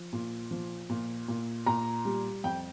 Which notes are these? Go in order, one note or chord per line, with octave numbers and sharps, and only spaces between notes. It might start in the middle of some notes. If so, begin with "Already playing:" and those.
Already playing: F3
A#2
F3
A#2
A#2
A#2 A#5
G3
F2 G5